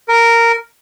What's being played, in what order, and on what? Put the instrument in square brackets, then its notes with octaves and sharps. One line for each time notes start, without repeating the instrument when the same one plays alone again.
[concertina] A#4